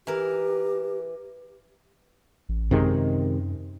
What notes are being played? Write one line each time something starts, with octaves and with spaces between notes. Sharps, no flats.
E3 G4 A#4
A1
F#2 C3 D#3 G#3